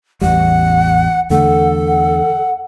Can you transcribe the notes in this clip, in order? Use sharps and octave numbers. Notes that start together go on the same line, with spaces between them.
A1 E2 G3 F#5
E2 D3 A3 A4 F#5
F#5